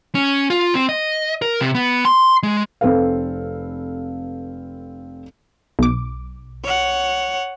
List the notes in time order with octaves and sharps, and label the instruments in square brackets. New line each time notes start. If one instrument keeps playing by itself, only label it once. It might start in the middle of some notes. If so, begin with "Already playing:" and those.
[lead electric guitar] C#4
F4
C4
D#5
A#4
C3
B3
C6
G#3
[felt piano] F1 C4 A4 B4 F5
[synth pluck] B1 D6
[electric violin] C#5 F#5